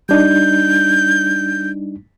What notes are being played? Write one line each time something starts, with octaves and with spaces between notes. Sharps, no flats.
G3 D4 D#4 G6